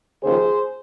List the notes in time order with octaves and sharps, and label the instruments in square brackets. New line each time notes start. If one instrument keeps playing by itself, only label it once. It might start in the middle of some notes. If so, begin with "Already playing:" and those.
[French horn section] D#2 C#3 F3 G#4 C5